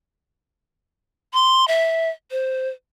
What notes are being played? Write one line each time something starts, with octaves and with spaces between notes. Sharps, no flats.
C6
E5
C5